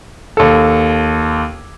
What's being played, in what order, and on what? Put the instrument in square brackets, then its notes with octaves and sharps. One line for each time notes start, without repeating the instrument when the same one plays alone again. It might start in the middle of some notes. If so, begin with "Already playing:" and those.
[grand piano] D#2 A4